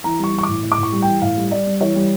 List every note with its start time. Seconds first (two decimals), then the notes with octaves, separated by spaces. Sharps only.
0.04 E3 A#5
0.19 G3 C#6
0.33 E3
0.38 C#6
0.43 D6
0.48 A2
0.63 A2
0.72 D6
0.78 A2
0.83 C#6
0.92 G3
1.02 E3 G5
1.22 A2 F5
1.37 G3
1.51 G3 D5
1.66 G3
1.81 E3 C#5
1.96 G3